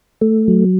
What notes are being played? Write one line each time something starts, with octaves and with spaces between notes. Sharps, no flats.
A3
F#3